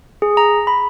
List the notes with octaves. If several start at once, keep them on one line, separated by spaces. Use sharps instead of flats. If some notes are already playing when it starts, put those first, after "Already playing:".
G#4
A#5
B5